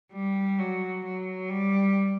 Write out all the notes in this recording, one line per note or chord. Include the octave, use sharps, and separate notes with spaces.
G3
F#3
F#3
G3